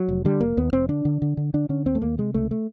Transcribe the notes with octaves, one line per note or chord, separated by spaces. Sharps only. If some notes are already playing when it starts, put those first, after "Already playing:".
Already playing: F#3
F1
D3 G3
F1 A#3
D#2 B3
F1 C4
D3 D4
D3
D3
D3
D3 D4
D3 C#4
D#2 C4
A3
D#2 A#3
C3 G#3
C#2 A3
A3